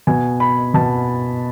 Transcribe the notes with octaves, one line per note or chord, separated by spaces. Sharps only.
B2 G#5
B5
B2 A5